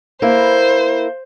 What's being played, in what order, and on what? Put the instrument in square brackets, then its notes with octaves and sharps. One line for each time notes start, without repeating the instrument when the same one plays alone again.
[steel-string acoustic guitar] A#3 E4 B4 [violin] C5